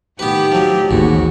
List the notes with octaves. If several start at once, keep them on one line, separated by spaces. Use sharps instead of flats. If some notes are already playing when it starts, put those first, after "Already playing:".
A2 D#3 B3 G4 B4
F3 F#3
A1 D#2 G#2 G#3 F#4